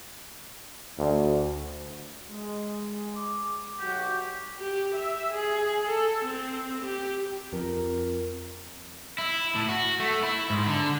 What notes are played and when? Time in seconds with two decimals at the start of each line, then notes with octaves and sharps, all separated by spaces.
0.98 D2
2.28 G#3
3.16 D6
3.80 B1 F#4 G4
4.59 G4
4.95 E5
5.33 G#4
5.88 A4
6.25 C4
6.85 G4
7.53 F2 A#4
9.18 E4
9.55 A2
9.68 F#4
9.99 A3
10.23 E4
10.50 G#2
10.66 D3